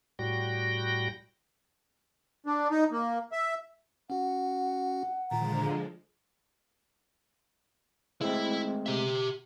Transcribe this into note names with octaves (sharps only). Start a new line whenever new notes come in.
A2 G3 F#4 G5 A#6
D4
D#4
A#3
E5
C#4 F#4 F#5
A#2 D3 D#3 F3 G#3 F4 A#5
G#3 A3 C4 E4
G4 E5